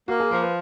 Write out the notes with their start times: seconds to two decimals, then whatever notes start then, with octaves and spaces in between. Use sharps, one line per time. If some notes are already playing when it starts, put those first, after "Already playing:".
0.08 A#3 F#4
0.20 G#4
0.31 F3 A#4
0.42 B4